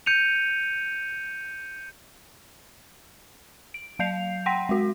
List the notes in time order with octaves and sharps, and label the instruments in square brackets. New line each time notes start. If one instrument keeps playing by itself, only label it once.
[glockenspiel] G6 C#7 D#7 F7
[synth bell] D7
F#3 F5 G6 C7 F7
F#5 G5 C6 A#6 B6
G#3 F#4